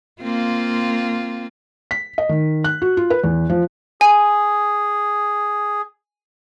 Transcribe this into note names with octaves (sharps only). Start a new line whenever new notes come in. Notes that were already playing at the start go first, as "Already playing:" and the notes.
A#3 C4 F4
B6
D#5
D#3
F#6
F#4
F4
B4
E2
F3
G#4 G#5